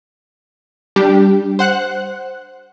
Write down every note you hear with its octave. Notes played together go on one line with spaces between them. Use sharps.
G3 D4 G4
C5 F#5 F#6